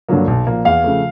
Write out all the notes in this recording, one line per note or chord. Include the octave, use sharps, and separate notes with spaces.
G2 D3 F#3 A#3
B1
A#2 F3 A#3
E2 F5
C#3 F3 A3